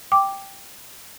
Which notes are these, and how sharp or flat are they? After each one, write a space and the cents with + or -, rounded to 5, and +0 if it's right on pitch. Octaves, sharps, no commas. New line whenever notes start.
G5 +0 D6 +0